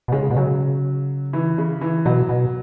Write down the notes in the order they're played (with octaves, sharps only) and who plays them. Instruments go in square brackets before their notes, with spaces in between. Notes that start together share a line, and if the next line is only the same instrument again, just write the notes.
[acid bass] B2
[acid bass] C#3 [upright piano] G#3
[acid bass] B2
[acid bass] C#3 [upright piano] F#3
[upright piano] E3
C#3
E3
[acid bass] B2 [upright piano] F#3
[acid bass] B2